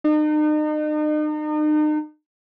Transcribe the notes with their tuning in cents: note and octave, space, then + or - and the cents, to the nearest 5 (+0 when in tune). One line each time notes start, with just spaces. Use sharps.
D#4 -40